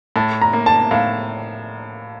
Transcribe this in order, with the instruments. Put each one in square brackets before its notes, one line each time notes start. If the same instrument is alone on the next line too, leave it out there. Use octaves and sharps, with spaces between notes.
[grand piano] A2 [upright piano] A5
[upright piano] A#5
[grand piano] A#3
[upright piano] A5
[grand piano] A2 [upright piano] F5